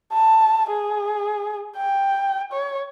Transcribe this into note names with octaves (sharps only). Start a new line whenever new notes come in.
A5
G#4
G5
C#5